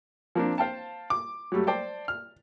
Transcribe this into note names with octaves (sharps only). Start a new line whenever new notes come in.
F3 A#3 C4 D4
C5 F5 G5 A5
D6
F#3 G3 A3
C5 D5 G5 A5
F6